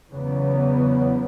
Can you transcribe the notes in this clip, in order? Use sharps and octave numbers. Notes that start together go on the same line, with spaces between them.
E2 C#3 F#3 B3